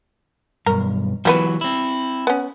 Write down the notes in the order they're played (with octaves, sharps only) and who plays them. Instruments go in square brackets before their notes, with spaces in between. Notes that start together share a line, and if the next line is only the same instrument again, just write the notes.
[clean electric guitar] B1 G2 [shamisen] A#4
[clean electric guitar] E3 F#3 [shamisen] G3 B3 B4
[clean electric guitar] C4 E4
[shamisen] B3 C#4